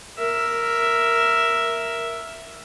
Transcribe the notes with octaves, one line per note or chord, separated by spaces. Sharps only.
A#4 E5